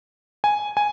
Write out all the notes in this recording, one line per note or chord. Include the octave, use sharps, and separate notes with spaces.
G#5
G#5